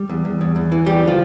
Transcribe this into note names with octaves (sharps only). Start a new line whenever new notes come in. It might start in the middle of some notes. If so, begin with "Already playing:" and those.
Already playing: G3
E2
E2
E2
E2
E3
E2 G3 G4
D3
F3 F4